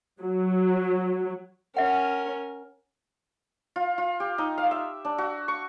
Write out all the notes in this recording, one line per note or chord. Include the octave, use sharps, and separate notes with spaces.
F#3
C#4 A#4 E5 F#5
F4
F4
G4
D#4
F5
E5
D4
F#4
C#6